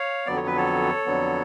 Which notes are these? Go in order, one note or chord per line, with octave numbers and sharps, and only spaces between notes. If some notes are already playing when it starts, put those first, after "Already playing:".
Already playing: C#5 F5
F2 D3 F#3 B3 D5
C#5
B4
A4 C#5
F2 D3 F#3 B3